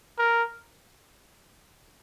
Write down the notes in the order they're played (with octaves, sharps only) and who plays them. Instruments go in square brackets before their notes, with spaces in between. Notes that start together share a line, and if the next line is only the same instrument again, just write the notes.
[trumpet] A#4